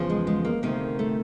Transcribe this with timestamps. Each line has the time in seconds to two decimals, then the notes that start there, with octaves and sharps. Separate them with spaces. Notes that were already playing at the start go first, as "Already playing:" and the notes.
Already playing: E2 C#3 F3
0.10 G#3
0.27 G#3
0.45 A#3
0.63 D2 C3 D#3 A#3
0.99 A3